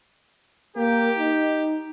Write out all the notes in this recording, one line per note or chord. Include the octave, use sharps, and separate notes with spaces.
A#3 G4 A#4
D#4